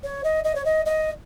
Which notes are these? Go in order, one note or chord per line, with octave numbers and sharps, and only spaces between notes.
C#5
D#5
D#5
C#5
D#5
D#5